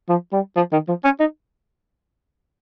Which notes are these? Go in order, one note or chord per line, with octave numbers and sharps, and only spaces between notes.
F3
G3
F3
D#3
F3
C#4
D#4